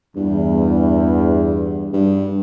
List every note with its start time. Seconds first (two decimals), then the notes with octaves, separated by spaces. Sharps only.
0.16 E2 G2
1.93 G2